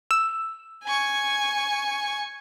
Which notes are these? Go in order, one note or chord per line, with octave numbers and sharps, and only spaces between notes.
E6
G#5 C#6